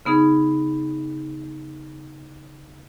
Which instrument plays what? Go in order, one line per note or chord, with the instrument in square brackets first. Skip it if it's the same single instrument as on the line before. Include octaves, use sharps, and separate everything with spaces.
[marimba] C#3 B3 D#4 G#4